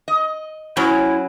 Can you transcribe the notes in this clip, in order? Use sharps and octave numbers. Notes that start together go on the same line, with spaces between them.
D#5
F#3 C#4 E4